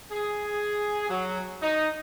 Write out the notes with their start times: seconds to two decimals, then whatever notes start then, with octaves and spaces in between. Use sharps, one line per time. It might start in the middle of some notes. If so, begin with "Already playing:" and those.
0.12 G#4
1.10 F#3
1.63 D#4